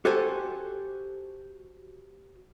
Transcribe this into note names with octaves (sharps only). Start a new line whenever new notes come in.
F#4 G4 A4 C5 G#5